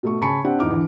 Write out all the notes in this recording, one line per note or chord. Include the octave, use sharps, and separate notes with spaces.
B2 A3 C#6
C#3 G#5 A5 B5 C#6 C#7
C4 D4 G4 F#5
E2 D#4 D6 F6
D3 E3